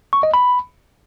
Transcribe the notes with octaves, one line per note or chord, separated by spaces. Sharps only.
C#6
D#5
B5